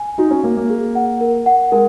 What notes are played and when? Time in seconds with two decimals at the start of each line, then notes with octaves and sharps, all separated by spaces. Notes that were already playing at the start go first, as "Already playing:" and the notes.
Already playing: G#5
0.18 D#4 F#4
0.31 C#4
0.44 A#3 A#4
0.57 A#3
0.70 G#4
0.95 F#5
1.21 A#4
1.46 F#5
1.72 G#3 A#4